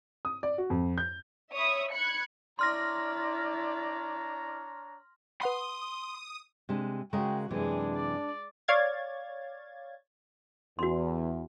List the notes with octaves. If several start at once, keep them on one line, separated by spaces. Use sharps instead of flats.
D#6
D5
F#4
F2
G6
C#5 E5 B5 D#6
B5 F#6 G#6 C#7
D4 E4 C#5 D5 A#5 C6 F6 A#6
B4 F#5 B5 C6 D#6
C3 G#3 D4
C#3 G#3 F#4 A#4 G5
F#2 C3 E3 G#3 D4 G#4
D5
C#5 D5 F5 G#6 A6
E2 F#4 C6